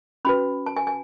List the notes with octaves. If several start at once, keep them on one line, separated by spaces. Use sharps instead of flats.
C#4 F#4 B4 B5
A5
G#5
G#5